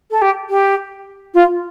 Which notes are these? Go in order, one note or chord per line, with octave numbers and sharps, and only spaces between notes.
A4
G4
G4
F4